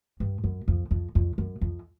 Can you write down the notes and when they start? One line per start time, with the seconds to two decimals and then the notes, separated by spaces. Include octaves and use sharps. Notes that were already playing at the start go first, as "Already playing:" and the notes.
0.20 G2
0.44 F#2
0.68 F2
0.91 F2
1.15 F2
1.38 F#2
1.61 F2